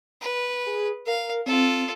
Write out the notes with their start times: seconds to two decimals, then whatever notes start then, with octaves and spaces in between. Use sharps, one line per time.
0.22 B4
0.66 G#4
1.07 A#4 F5
1.46 C4 F4 A4